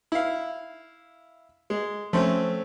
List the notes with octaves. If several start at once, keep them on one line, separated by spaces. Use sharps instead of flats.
E4 F5
G#3
F3 A3 C4 C#4